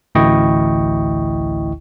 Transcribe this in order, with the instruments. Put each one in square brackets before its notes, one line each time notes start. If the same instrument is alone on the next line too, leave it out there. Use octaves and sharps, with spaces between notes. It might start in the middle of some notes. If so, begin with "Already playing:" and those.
[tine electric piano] A1 D2 E4 D#5 G5 C#6